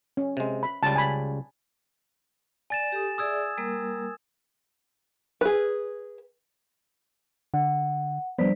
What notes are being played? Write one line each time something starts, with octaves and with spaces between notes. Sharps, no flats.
C#4
C3 G#3
B5
C#2 C#3 G3 A5
G#5 B5
D5 G#5 A6 E7
G4 A4 D#6
G#4 D5 E5 D#6 E6 G#6
G3 A#3 A#4
G#4 B4
D3 F#5
F3 G3 B3 D4 C5 D5 B6